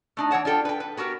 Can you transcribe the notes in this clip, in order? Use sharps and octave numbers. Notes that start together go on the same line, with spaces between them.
A3 D4 D#4
E3 C#5 F#5 A5
D4 F4 A4 G5
B4 G5
B4
B3 F#4 G4 A#4